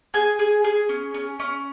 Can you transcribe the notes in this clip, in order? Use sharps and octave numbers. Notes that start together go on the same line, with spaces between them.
G#4 G#5
G#4
G#4
C#4
C#4
C#4